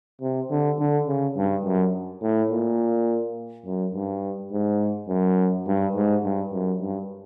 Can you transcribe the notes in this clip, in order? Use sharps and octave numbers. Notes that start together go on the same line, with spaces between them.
C3
D3
D3
C#3
G2
F#2
A2
A#2
F#2
G2
G#2
F#2
G2
G#2
G2
F#2
G2